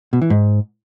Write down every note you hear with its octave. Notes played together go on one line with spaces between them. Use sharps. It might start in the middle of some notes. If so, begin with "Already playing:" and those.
B2
E3
G#2